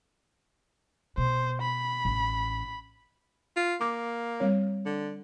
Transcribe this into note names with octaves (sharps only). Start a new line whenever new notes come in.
B2 C5
B5
A1
F4
A#3 D6
G3 C4 C#5
D3